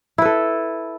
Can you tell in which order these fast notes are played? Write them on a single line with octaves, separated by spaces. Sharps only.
E4 B4 A4